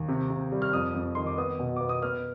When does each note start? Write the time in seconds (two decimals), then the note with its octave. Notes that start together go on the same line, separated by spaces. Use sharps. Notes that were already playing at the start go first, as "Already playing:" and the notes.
Already playing: D#2
0.08 C3
0.30 C3
0.52 G3
0.62 F6
0.73 F2 D#6
0.95 F2
1.15 D#3 C6
1.26 D6
1.38 B3 D#6
1.59 B2
1.76 B3 D6
1.89 D#6
2.02 B3 F6